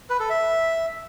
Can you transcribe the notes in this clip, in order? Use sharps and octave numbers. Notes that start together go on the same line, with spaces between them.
B4
A4
E5